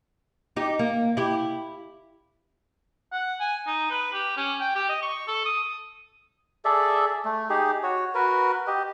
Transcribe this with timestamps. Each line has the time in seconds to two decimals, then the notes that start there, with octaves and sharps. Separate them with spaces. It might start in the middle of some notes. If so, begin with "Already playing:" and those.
0.56 D#4 G4
0.79 A#3
1.17 E4 G4
3.12 F#5
3.40 G#5
3.67 D#4
3.91 B4
4.13 G4
4.37 C#4
4.60 G5
4.75 G4
4.89 D#5
5.03 C#6
5.27 A4
5.46 D#6
6.65 G#4 A4 D5 E5
7.25 A3
7.50 D#4 G4 G#4
7.83 F#4 C#5
8.15 F#4 A#4 B4
8.67 G4 D#5